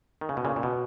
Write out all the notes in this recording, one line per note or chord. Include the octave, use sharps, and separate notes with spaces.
D#3
C#3
B2
A#2 C#3
A#2
B2